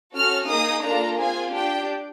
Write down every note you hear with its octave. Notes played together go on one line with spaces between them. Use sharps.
C#4 F#4 A4 F6
A#3 D#4 G#4 D#6
A#3 D4 F4 A4 A#5
C4 F4 G#4 G#5
D4 G4 G5